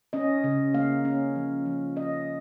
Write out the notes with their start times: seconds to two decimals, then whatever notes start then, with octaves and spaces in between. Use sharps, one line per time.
0.13 C#4 D#5
0.44 C#3
0.74 A#3 F5
1.05 C#4
1.36 F3
1.66 F3
1.96 C#4 D#5